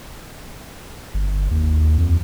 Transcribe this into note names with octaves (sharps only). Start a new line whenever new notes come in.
G1
D#2
F2